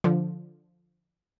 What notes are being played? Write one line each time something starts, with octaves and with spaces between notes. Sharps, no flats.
D3 F3